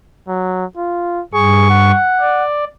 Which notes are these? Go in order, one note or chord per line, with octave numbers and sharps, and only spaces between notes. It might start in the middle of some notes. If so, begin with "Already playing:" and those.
F#3
F4
G2 G#4 C#6
F#5
D5